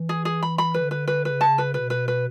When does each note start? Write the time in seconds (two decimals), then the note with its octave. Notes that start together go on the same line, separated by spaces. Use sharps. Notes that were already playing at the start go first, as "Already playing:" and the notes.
Already playing: E3
0.09 G#4
0.25 G#4
0.43 B5
0.58 B5
0.74 D3 B4
0.91 B4
1.08 B4
1.24 C#3 B4
1.41 A5
1.58 B4
1.74 B2 B4
1.90 B4
2.08 B4